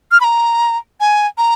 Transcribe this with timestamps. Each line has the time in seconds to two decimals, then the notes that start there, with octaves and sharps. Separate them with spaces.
0.12 F6
0.21 B5
0.24 A#5
1.00 G#5
1.38 A#5